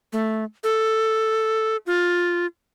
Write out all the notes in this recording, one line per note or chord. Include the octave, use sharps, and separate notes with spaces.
A3
A4
F4